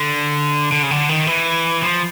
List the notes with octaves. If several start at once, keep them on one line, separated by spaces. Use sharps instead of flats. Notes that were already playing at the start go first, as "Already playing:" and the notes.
Already playing: D3
D3
C#3
D3
D#3
E3
F3